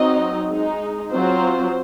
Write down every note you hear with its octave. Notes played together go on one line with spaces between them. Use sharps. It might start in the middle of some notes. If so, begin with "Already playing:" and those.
Already playing: F#3 C4 D#4 D#5
G#3 D#4
F#3 C4 F4 C5